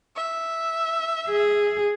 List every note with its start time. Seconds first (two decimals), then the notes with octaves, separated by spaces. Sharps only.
0.16 E5
1.28 G#4